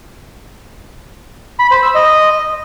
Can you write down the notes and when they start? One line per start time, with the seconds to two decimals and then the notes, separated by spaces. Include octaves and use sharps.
1.59 B5
1.71 C5
1.83 E6
1.95 D#5